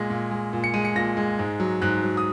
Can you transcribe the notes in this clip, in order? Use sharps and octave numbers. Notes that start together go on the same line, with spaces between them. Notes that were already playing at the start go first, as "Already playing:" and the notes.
Already playing: A#2 G#3 A#6
A#2
G#3
A#2
C#7
G#3 D#7
C#7
A#2 A#6
G#3
G#2
F#3
G#2 F#6
F#3
D#6